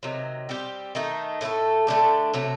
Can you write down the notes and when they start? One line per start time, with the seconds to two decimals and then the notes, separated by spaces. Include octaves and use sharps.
0.03 C3 D#3 F#3
0.49 G3 C4 G4
0.95 D#3 A3 D#4
1.41 A2 A3 D4 A4
1.87 D3 A3 D4 G4
2.34 C3 F#3 A3